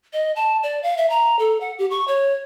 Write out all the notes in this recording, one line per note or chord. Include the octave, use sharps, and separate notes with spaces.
D#5
A5
D5
F5
E5
A#5
A4
F#5
G4
C#6
C#5